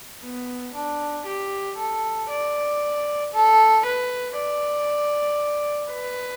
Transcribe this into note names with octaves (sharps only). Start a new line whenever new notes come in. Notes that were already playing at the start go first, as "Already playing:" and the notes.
B3
D4
G4
A4
D5
A4
B4
D5
B4